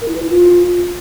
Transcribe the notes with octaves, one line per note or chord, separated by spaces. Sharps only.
A#4
E4
B4
E4
F4